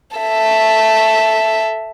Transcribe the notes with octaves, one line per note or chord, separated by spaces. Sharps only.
A4 E5